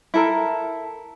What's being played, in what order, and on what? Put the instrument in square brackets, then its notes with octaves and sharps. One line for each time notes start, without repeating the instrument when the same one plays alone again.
[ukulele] E4 A4 A#4